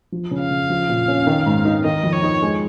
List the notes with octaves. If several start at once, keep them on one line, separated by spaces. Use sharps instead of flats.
F3
C#3
F5
C#3
F3
A#2
C#4
D#3
G#2
D#4
D#3 D#5
F2
C#5
D#4
G#3